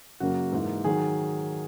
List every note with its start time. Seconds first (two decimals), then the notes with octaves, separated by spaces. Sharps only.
0.20 F#2 C#3 F#3 A#3 F#4
0.52 G#2 E3 A#3
0.84 D#3 F#3 G#4